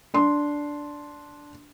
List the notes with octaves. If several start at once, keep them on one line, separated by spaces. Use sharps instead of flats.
D4 C6